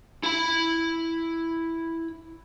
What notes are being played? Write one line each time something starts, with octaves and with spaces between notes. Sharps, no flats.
E4 B5